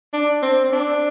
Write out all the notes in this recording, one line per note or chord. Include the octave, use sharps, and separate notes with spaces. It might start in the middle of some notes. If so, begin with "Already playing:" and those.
D4
C4
C4
D4